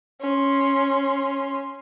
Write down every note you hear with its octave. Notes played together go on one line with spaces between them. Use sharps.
C#4 C6